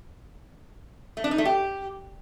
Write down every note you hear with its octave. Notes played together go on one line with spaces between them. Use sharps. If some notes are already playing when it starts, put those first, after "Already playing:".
A3
D4
D#4
A3
G4